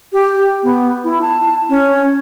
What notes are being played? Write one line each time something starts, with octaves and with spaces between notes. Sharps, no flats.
G4
B3
E4
A5
C#4